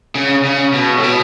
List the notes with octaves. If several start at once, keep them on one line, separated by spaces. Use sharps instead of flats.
C#3
C#3
B2
A2
B2